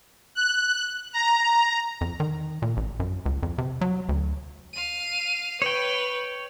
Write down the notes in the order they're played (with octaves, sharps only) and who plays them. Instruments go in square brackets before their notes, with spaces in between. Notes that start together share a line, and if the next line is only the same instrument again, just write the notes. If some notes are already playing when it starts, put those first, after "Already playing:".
[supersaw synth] F#6
A#5
[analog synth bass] F2
D#3
A#2
A1
F#2
C#2
F2
C3
F#3
D2
[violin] F5 D#7
[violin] B4 [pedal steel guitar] C#5 G5